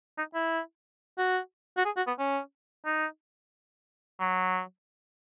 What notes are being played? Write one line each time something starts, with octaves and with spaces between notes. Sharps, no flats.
D#4
E4
F#4
F#4
G#4
F#4
B3
C#4
D#4
F#3